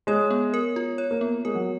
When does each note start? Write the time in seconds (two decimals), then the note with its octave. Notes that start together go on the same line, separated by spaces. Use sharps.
0.07 G#3 C#5
0.31 B3
0.54 A#4
0.76 F4
0.98 C#5
1.11 A#3
1.21 B3
1.45 G#3 A#4
1.55 F#3